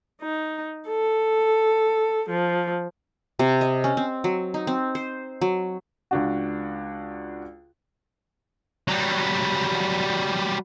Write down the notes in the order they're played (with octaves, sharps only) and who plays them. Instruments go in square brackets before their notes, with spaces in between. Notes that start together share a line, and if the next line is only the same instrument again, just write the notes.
[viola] D#4
A4
F3
[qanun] C3
D#5
C#4
C4
F#3
D#4
C4
C5
F#3
[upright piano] C#2 D4 F#4
[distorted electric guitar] F#3 G3